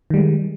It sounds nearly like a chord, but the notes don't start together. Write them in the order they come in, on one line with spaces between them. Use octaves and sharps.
D#3 G3 G#3